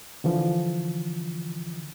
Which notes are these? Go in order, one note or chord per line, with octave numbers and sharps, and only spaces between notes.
D3 E3 F3